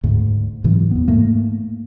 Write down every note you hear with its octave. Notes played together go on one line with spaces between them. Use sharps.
D2 G#2
G#2 C3 E3 F#3
E2 B3
G#2 A3 A#3